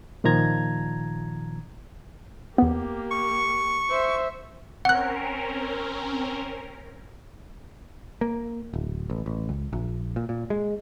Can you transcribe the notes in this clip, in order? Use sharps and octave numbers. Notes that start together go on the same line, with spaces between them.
A#2 D#3 F3 A#5 G#6
E2 A#3 B3 G4
C#6
C5 E5
C4 C#4 A#4 F#5 F#6
A#3
D1
A1
A1
C#2
A#1
A#2
A#2
G#3